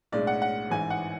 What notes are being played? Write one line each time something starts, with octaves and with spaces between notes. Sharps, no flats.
B1 A2 G#3 D4 D5
F#5
F#5
A1 G#2 E3 G#5
F#5